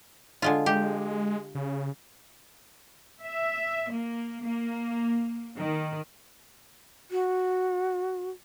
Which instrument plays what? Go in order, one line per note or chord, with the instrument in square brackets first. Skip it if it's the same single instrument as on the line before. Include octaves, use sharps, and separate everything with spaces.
[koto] D3 G#3 F4
[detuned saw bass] G#3 [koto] G4
[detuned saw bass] C#3
[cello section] E5
A#3
A#3
D#3
[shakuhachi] F#4